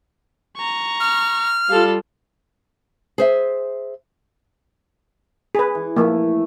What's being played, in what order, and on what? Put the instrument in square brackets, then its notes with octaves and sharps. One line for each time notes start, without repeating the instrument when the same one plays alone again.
[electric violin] A#5 C#6
[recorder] F6
[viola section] G3 F4 [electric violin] A4 F5
[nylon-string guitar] G#4 C5 E5
[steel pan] G#4 B4
[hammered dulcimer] E3
[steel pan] F3 A#3 [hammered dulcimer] A3 E4